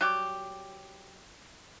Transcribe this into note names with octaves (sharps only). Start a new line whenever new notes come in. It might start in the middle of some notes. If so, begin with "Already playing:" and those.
F#3 G3 G4